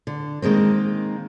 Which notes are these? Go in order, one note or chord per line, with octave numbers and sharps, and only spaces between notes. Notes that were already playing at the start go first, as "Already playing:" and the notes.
D3
D#3 G#3 A#3 C4